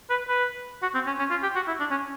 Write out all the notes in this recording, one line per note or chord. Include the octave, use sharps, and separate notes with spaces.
B4
B4
F#4
C4
C#4
C#4
F4
G4
F#4
E4
D4
C#4